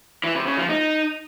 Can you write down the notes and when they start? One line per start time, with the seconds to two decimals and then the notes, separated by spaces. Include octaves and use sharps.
0.24 E3
0.35 C3
0.46 C#3
0.58 F3
0.69 D#4